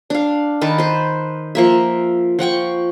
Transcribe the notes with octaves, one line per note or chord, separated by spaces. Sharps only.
D4 F5
D#3 B4 A5
B4 C5
F3 A#3 E5
F3 F#5 G5 C#6